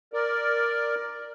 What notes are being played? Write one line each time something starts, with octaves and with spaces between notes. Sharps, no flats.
A#4 D5